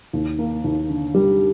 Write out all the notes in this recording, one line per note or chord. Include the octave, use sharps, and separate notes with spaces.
D#2
A#3
D#2
D3
G3